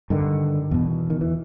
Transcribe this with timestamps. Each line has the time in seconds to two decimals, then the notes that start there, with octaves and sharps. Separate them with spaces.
0.10 G2 D3 D#3
0.71 E2 B2
1.10 D#3
1.21 E3